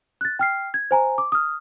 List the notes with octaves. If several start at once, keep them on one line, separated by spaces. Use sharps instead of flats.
F#6 A6
G5 F6 C7
G#6
C5 G#5 A#5
D6
D#6 F6